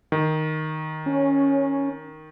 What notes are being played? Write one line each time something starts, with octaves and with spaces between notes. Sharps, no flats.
D#3
C#4